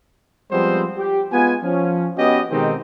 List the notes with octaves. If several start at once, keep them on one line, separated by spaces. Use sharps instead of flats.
F3 G3 G#3 B3 C4 C5
G4
G#3 B3 F4 G#5
F3 C#4
B3 C#4 F#4 G4 D#5
B2 D#3 G#3 C4 D#4 G4